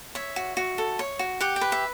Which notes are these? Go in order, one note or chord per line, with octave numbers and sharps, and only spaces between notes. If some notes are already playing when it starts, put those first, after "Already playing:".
C#5 E5
F#4
F#4
A4
C#5
F#4
G4 F#5
G5
B4
E5